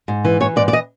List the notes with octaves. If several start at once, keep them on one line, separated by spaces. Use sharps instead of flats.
G#2
E3
E3 C#5
G#2 D5
D5
D#5